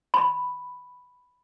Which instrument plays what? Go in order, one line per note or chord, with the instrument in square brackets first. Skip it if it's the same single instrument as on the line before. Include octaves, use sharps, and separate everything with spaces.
[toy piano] B5